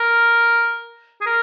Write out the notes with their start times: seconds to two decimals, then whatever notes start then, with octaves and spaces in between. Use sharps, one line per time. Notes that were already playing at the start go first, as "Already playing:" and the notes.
Already playing: A#4
1.21 G#4
1.26 A#4